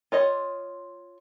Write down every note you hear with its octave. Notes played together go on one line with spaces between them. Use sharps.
F4 C#5 D#5